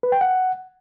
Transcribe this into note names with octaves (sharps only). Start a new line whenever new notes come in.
B4
G5
F#5